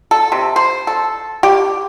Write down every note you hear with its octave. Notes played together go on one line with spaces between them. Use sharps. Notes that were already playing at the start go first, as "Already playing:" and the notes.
A4
C3
C5
A4
G4